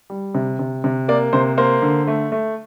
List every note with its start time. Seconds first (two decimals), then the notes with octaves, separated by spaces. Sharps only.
0.10 G3
0.35 C3
0.59 C3
0.84 C3
1.08 A#3 D5
1.33 C3 C5
1.58 A#3 C5
1.82 D3
2.07 A3
2.32 A3